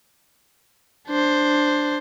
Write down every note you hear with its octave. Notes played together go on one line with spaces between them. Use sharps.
D4 C5